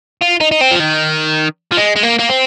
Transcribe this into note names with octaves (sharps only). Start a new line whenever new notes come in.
F4
D#4
D#4
C4
F3
D#3
F3
G#3
G#3
A#3
A#3
C4